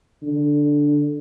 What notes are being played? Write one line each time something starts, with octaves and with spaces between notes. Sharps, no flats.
D3